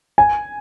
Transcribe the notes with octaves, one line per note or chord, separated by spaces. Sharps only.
G#5